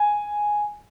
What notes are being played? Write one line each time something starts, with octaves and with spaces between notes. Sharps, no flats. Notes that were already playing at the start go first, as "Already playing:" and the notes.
Already playing: G#5